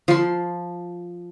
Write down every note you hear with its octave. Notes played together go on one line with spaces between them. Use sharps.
F3 C6